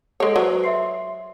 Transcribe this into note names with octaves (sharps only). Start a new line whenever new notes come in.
G#3 A4 C#5 F#5 D7
F#3 B4 C5
E5 C6 C7